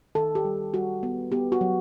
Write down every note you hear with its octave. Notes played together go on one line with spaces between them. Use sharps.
D#3 A4
G4
G3
G3 F#4
B3
B3 G4
F#4
F#3